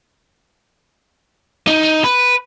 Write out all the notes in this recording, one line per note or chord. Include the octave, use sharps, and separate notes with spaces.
D#4
B4